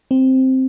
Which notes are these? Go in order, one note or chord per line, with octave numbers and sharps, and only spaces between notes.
C4